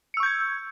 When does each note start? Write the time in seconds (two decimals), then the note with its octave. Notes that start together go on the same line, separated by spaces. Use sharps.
0.14 C#7
0.17 E6
0.20 C#6
0.23 G6
0.26 G#6